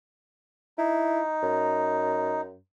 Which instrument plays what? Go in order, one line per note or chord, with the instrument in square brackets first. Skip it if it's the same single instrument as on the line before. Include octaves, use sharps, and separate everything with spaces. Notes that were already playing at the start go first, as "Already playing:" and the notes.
[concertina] D#4 [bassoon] E4
[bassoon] F#2